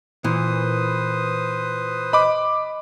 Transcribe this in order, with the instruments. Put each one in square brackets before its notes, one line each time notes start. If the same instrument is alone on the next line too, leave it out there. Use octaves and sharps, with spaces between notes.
[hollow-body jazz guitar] A#2 E3 [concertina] B4 C5 D#6
[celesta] D#5 [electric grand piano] B5 D6